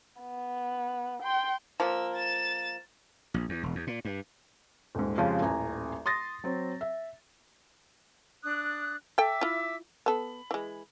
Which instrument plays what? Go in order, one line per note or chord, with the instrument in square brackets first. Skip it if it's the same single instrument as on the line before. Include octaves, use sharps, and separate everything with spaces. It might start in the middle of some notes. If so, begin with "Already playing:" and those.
[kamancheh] B3
G5 C6
[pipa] F3 A#3 [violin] E6
[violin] A6 E7
[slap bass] A#1
E2
E1
E2
A#2
G2
[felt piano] D#1 G#2
F2 C#3 F3 G#3 F4 G4
D#1 A1 G#5 A#5
C6 D#6 A6 A#6
F#3 C4
E5
[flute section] D4 D#6 F#6
[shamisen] A4 G5 [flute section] E5 D6 E6
[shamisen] E4 F4
[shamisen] B3 A4 [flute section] B5
[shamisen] E3 G#3